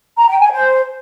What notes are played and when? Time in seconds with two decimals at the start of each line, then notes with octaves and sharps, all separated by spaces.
0.16 A#5
0.28 G5
0.40 G#5
0.52 C5